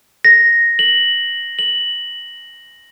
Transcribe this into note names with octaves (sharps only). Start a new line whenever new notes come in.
A#6
F#7
F#7